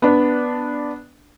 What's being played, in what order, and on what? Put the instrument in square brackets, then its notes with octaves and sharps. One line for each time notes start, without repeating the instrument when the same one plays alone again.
[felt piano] B3 D4